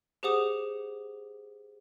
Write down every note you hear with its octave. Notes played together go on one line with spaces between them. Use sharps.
G4 G#4 C5 F#5 D6 D#6